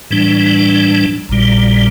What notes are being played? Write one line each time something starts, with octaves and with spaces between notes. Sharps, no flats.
A2 E3 G3 D4
A#1 A#2 G3